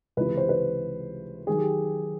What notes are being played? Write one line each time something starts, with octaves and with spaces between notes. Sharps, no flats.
C#2 C3 E3 B4
C5
B4
D#3 F#3 G#4
G4